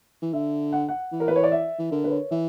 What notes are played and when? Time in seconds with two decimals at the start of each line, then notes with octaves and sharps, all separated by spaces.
0.22 E3
0.33 D3 E5
0.73 F#5
0.89 F#5
1.12 E3
1.20 A#4
1.28 B4
1.36 C#5
1.44 D5
1.52 E5
1.78 E3
1.91 D3 A#4
2.04 B4
2.11 C#5
2.31 E3 E5